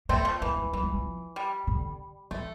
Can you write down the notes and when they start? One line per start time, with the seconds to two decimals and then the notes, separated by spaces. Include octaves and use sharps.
0.09 A3 A#3 C4
0.25 F3
0.42 E3 A#3
0.57 A3
0.73 E3 G3
0.83 G3
0.94 F3
1.36 G3
1.67 D3
2.31 E3 A3